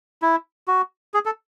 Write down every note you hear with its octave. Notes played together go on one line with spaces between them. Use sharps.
E4
F#4
G#4
A4